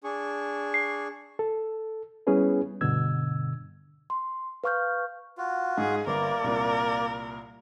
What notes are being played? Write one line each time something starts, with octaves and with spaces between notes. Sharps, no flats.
D4 G#4 C#6
C7
A4
G3 B3 C#4 E4 G#4 B4
G2 B2 D3 E6 G#6
C6
B4 F5 C#6 F6 G6
F4 F#4
G#2 G#4
G1 A#3 A#4 D5
C2 A#2